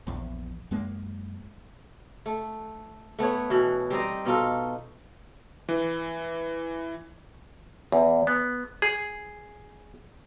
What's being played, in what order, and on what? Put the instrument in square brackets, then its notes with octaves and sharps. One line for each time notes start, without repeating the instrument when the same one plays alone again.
[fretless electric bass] A#1 E2
F#2 G#3 A#3
[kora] A3
A3 B3 B4 C#5
B2 E3
G3 C4 D#4 D#5
B2 D#4 F4 A4
[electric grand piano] E3
[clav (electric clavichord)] E2
B3
G#4